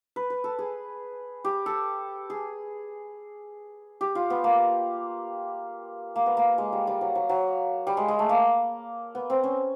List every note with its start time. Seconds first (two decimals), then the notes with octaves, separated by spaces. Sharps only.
0.16 B4
0.30 B4
0.44 A4
0.59 G#4
1.45 G4
1.66 A4
2.30 G#4
4.01 G4
4.15 F4
4.30 B3
4.44 A#3
6.16 A#3
6.26 B3
6.37 A#3
6.58 G#3
6.73 G3
6.87 G3
7.01 F#3
7.15 F#3
7.29 F#3
7.87 G3
7.97 G#3
8.08 G#3
8.19 A3
8.29 A#3
9.15 B3
9.30 C4
9.44 C#4